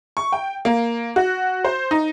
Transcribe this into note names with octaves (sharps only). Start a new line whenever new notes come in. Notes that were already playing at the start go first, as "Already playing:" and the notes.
C#6
G5
A#3
F#4
C5
D#4